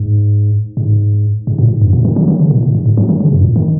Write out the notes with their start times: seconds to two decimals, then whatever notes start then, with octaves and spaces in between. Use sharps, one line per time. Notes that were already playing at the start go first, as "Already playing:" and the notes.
Already playing: G#2
0.77 G#2
1.47 G#2
1.59 A#2
1.70 G#2
1.81 F#2
1.93 A#2
2.05 D#3
2.16 F#3
2.28 D#3
2.39 C#3
2.51 A#2
2.63 A#2
2.75 G#2
2.86 G#2
2.97 F#3
3.09 D#3
3.20 C#3
3.33 F#2
3.44 A#2
3.56 D#3